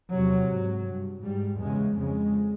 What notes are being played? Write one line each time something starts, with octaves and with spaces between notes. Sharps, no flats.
E2 C3 F#3
G#2
G2
G#2 G3
E2 C#3 G#3
F2 C#3 G#3